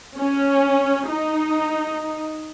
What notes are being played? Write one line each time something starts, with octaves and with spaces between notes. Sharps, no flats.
C#4
D#4